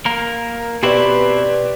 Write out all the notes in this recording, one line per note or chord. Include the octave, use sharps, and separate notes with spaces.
A#3 A#4
B2 C4 E4 G4 B4 D5